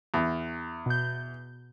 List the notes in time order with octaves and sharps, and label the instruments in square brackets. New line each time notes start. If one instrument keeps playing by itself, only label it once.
[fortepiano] E2
[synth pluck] B2 G6